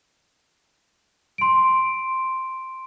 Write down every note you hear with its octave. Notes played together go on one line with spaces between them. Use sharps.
C6 D7